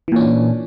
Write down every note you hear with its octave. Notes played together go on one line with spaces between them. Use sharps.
A#2 E3 C#4 D4